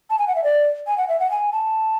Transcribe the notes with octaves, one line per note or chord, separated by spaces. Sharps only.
A5
G#5
F#5
E5
D5
G#5
F#5
E5
F#5
G#5
A5